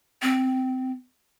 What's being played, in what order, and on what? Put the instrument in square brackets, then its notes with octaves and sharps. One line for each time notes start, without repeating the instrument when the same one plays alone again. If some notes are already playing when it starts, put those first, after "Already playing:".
[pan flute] C4